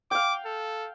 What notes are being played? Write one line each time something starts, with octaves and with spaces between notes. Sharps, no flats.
F5 G5 D6
A4